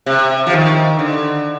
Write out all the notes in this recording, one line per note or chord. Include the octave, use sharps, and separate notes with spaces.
C3
F3
D#3
D3